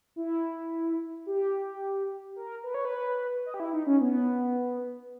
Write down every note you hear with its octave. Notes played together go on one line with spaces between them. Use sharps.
E4
G4
A#4
B4
C#5
B4
D#5
G4
E4
D#4
C#4
B3